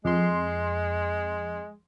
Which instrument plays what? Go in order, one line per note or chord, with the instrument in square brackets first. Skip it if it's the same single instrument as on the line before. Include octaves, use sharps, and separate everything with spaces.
[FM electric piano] F2 C6 [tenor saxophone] G#3